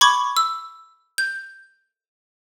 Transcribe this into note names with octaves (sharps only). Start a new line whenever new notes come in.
B5 C#6 D6 G#6
E6
G6